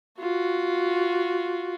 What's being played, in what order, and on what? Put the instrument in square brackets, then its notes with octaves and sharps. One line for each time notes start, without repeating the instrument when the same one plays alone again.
[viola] F4 F#4